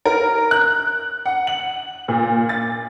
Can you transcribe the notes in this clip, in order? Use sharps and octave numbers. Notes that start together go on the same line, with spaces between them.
A#4
F#6
F#5
F#7
A#2
A6